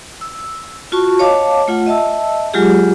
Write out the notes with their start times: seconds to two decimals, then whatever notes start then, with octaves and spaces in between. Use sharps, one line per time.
0.21 E6
0.92 F4 F#4 A5 C#6
1.19 C#5 D#5 F5 A5 D6
1.68 A3 F4 F#5
1.86 D#5 E5 A5 E6
2.54 F#3 G#3 F4 G4 G#4